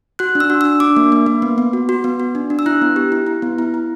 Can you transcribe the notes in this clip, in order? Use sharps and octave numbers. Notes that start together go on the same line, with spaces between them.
F#4 F#6
D4
E6
F#4
D4 E6
D4 D6
A#3
A#3
A#3
B3
B3
F#4
F#4
B3
F#4
D4
D4
E6
E4 F#6
B3
G4
E4
E4
B3
E4
E4